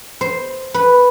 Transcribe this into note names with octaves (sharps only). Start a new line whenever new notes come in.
C5
B4